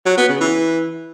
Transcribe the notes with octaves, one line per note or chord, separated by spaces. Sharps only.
F#3
B3
C#3
E3